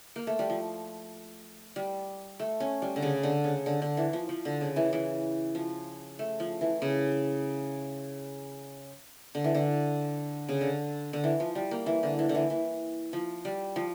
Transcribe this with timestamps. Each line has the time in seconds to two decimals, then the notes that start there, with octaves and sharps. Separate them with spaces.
0.16 A#3
0.27 A3
0.39 G3
0.50 F3
1.76 G3
2.40 A3
2.60 C#4
2.82 G3
2.96 D3
3.02 C#3
3.23 D3
3.44 C#3
3.66 D3
3.82 D3
3.97 E3
4.13 F3
4.29 F3
4.45 D3
4.61 C#3
4.76 E3
4.93 E3
5.55 F3
6.19 A3
6.40 F3
6.61 E3
6.82 C#3
9.35 D3
9.44 E3
9.55 D3
10.49 C#3
10.61 D3
11.13 D3
11.24 E3
11.40 F3
11.55 G3
11.71 A#3
11.86 E3
12.03 D3
12.19 E3
12.29 D3
12.35 E3
12.50 E3
13.13 F3
13.45 G3
13.76 F3